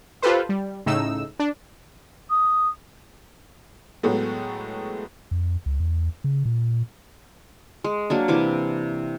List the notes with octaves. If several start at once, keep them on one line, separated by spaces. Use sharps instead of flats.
F4 G4 A4 B4 C5
G3
A2 C#3 D#4 E6
D4
D#6
A2 F#3 G#3 A3 B3
F2
C#2
E2
C#3
A#2
G#3
F#3 A#3 D4
C3 E3 D6